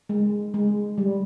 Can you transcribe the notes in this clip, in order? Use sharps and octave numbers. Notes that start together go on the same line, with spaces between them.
G#3
G#3
G3